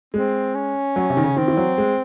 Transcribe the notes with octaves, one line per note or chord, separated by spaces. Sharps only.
G#3 C4
C#4
F#3
C3
D#3
C#3
D#3 C4
E3
F#3
G#3